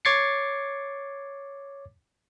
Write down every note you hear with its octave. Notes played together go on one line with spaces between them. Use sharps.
C#5 D6 G#6 A6 C7 C#7